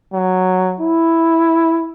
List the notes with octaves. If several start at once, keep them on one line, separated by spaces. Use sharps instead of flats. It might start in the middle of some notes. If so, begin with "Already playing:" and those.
F#3
E4